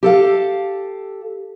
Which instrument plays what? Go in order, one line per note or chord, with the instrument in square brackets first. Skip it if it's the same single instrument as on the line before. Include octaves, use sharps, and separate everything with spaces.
[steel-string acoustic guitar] G4 A4 F5